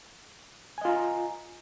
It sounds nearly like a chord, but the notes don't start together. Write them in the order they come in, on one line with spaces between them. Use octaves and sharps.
G#5 D#5 F4 A#5